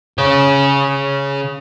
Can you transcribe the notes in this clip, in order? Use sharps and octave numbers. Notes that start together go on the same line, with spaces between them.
C#3 C#5